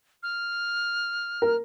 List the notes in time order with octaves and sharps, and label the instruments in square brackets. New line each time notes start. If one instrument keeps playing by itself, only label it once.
[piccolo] F6
[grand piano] A#4